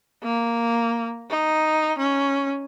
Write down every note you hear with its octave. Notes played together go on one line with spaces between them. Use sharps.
A#3
D#4
C#4